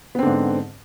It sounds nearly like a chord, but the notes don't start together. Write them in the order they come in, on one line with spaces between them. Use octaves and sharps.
B3 C4 D3 G#2